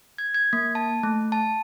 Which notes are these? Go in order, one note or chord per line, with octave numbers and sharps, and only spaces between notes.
G#6
G#6
A#3
A5
A3
A5